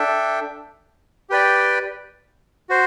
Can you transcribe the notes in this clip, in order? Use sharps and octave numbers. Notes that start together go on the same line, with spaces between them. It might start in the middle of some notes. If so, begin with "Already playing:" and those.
Already playing: D4 A4 E5 G5
G4 B4 D5 G5
F#4 C5